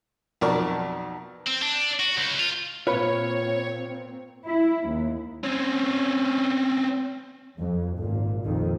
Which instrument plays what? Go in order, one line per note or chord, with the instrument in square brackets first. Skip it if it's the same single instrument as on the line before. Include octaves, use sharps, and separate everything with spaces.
[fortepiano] B1 F2 A#4 D5 A5 C#6
[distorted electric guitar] C4
D4
F#4
C#2
F4
[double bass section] A#2 C4 [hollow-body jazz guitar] F4 B4 B5 [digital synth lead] C#5
[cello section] E4
D#2
[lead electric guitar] C4 C#4
[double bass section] F2
G#1 A#2
A#1 F2 A#2 D#3